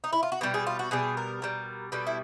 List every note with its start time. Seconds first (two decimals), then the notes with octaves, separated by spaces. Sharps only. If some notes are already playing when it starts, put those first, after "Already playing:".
0.04 D#4
0.13 E4
0.23 F4
0.32 F#4
0.41 B2 G3 G4
0.54 G#4
0.67 F4
0.79 F#4
0.91 B2 G3 G#4
1.17 A#4
1.42 B2 G3
1.92 B2 G3 A4
2.07 E4